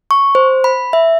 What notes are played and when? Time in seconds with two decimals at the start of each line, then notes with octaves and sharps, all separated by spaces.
0.11 C#6
0.35 C5
0.64 B5
0.93 E5